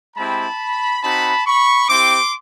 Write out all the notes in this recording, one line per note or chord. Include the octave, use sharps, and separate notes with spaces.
G#3 C4 E4 G4 A5 B5
C4 D#4 F#4 A5 B5
B5 C#6
C4 E4 G4 C6 D6